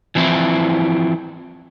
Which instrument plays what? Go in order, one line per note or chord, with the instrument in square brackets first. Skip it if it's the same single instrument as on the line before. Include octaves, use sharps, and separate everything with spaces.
[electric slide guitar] E3 F3 C4 E4